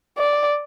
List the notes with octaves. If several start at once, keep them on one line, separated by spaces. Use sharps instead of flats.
D5